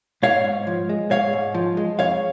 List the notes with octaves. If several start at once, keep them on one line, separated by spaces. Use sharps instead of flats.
G#2 C#5 F5
G#2
F3
G#3
G#2 C#5 F5
G#2
F3
G#3
F2 C#5 F5